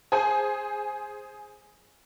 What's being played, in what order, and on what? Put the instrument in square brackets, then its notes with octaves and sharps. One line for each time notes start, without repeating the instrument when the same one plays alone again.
[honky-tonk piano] G#4 C5 G#5